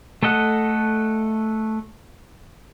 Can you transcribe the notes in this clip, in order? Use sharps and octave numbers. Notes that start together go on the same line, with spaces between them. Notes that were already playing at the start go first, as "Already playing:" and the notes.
A3 A4 D#5 F#5